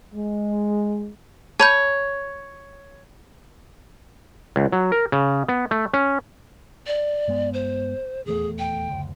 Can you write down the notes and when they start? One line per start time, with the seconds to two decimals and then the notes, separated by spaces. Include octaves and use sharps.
0.13 G#3
1.60 C#5 A5 B5 G6
4.56 C#2
4.72 F#3
4.92 A#4
5.12 C#3
5.48 B3
5.71 A3
5.93 C#4
6.87 D5
7.28 G2 G#3 B3
7.54 C5
8.26 D#1 E2 A3 G#4
8.59 G5
8.89 F#1 D2